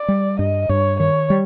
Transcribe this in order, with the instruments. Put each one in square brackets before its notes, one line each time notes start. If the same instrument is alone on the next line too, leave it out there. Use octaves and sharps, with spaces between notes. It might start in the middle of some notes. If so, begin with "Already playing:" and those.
Already playing: [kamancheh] D5
[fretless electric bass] G3
[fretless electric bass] G2 [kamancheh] D#5
[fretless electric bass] G2 [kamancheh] C#5
[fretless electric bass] D#3 [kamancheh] C#5
[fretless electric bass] G3